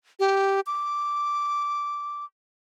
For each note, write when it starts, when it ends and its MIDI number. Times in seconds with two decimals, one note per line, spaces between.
0.20 0.60 67
0.67 2.25 86